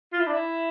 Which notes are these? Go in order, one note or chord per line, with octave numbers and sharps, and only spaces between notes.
F4
E4
D4
E4